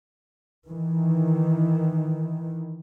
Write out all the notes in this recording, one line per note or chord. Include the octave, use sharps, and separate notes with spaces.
D#3 E3